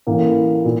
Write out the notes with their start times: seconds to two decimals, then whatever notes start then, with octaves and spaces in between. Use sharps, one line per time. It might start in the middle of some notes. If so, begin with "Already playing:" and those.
0.07 A1 A2 E3 A#3
0.65 A#2